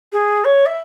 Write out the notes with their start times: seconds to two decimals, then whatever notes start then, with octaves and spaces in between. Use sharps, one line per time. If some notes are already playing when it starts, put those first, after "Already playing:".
0.12 G#4
0.44 C#5
0.66 E5